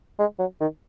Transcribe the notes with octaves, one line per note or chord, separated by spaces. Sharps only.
G#3
F#3
D#3